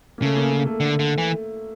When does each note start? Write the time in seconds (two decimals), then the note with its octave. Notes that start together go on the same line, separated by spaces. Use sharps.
0.18 A#3
0.22 C#3 A3
0.37 A#3
0.51 A#3
0.66 A3
0.80 D3
0.99 D3
1.18 E3